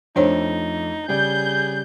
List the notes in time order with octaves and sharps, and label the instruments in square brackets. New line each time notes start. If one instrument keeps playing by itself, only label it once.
[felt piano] F2 A3 [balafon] D4 C5 C#5 [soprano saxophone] D#4
[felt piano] C#3 G3 D5 [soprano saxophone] G#4 [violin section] G6